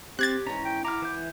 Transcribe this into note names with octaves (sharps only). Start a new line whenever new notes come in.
C4 G4 F#6 G#6 A6
G#2 E3 C#4 A#5
G5
E4 F#5 A#5 D6 F6
E3 G6